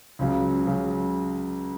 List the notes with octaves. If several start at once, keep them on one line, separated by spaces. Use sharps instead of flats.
C#2 C#3 F#3
C#3 F#3